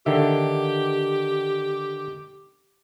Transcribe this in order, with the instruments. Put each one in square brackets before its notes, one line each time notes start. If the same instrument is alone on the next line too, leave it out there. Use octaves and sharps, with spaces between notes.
[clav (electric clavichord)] D3 D#3 E5 [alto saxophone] G4